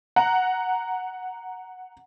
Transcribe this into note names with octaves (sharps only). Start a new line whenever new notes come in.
F#5 A#5